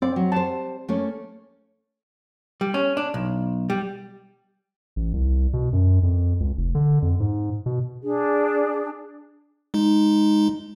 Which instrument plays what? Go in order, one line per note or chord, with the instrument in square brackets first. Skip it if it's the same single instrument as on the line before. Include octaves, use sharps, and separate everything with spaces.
[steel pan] C4 [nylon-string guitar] D5
[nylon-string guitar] F#3
[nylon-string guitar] G3 C5 [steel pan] A5
[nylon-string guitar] A3 A#3 C#4
[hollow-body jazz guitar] G3
C#4
D4
B1
G3
[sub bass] A1
C2
B2
F#2
F2
C#2
F1
D3
F2
G#2
B2
[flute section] D4 G#4
[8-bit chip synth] G#3 D#4